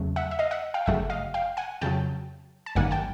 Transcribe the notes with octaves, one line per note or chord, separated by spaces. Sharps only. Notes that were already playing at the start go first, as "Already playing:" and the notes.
Already playing: E2 C#3 F#3 A3
E5 F#5
E5
D#5 F5
E5 F#5
F5 G5
G1 F#2 C#3 F#3 A3 E5 F#5
D#5 F5
F5 G5
F#5 G#5
F2 C#3 F#3 G5 A5
A5
G#1 F#2 D#3 G3 A#3 F#5 G#5
G5 A5